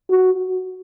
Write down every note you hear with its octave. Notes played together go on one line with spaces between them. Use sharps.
F#4